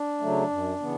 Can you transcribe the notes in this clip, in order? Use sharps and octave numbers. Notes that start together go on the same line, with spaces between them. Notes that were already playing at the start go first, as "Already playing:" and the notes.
Already playing: D4
C#3 F#3 A3
F#2
C#3 E3 B3